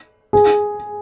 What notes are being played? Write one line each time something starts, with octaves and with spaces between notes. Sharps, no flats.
G#4